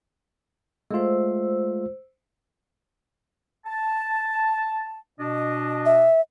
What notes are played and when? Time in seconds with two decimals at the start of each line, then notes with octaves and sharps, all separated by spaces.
0.91 G#3 A3 F4 C5 E6
3.66 A5
5.20 B2 D4 D#5
5.86 E5